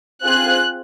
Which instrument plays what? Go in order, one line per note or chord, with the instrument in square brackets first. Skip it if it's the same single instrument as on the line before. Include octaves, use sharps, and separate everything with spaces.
[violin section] C4 F4 G#4 F#6